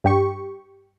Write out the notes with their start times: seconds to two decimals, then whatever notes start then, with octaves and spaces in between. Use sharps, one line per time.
0.04 G2 G4 C#6